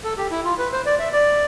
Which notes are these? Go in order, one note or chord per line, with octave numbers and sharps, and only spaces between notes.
A4
G4
E4
F4
B4
C5
D5
E5
D5